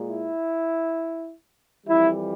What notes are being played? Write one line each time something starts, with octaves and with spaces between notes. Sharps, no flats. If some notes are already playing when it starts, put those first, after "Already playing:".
Already playing: A#2 G#3
E4
F2 E3 G3 E4